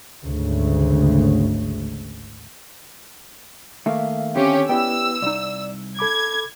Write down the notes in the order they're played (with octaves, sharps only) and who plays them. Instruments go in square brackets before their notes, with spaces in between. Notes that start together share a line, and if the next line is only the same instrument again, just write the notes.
[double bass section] G#1 D2 C#3
[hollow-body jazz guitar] D#3 A3 A#3 [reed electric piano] E5 F5
[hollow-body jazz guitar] D3 D#3 C4 [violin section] C#4 G4
[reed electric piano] B3 E4 B4 [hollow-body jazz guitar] G4 D5 G5 [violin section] E6
[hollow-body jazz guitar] C2 D#4 [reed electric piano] D5
[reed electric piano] A4 B5 D6 [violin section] G#6